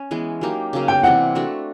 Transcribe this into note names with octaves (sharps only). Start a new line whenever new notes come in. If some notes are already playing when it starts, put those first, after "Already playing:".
Already playing: C#4
E3 G#3 B3
F#3 A#3 D#4 G4
C#3 F#3 A#3
G5
C3 E3 G3 C4 F#5
A3 D4 F#4